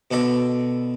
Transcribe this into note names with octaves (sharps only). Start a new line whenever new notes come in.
B2 D3 A4 D5